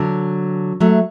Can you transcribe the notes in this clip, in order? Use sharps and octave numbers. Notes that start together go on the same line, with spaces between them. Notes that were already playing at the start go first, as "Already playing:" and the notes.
Already playing: D3 F#3
F#3 A3